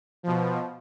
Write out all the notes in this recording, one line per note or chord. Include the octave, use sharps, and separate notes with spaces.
B2 F3